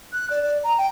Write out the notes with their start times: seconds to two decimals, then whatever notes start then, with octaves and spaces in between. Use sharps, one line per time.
0.13 F#6
0.30 D5
0.44 D5
0.64 A#5
0.78 G5